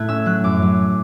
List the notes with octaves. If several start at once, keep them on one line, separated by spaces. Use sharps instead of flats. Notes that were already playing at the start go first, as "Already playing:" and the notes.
Already playing: A2 A3 F#6 G#6
C#4 E6
F#3 F#6
F#2 D6
F#3